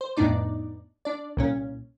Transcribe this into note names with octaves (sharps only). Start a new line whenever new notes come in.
C5
F2 A2 B3 D4 D#4 D5
D4 D5
C2 A#2 C#4